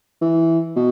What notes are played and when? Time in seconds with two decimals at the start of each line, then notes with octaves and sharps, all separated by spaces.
0.22 E3
0.76 B2